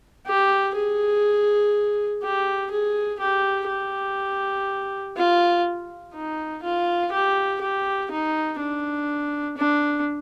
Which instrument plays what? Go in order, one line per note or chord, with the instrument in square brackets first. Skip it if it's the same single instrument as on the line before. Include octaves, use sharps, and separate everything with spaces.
[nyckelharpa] G4
G#4
G4
G#4
G4
G4
F4
D#4
F4
G4
G4
D#4
D4
D4